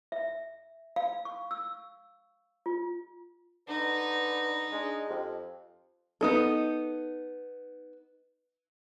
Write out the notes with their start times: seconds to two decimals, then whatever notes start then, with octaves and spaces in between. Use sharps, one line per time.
0.12 E5
0.96 F5
1.25 C#6
1.51 E6
2.66 F4
3.68 D3 D#4 B4
4.72 G#3 D4
5.09 F2 G4
6.21 B3 D#4 A4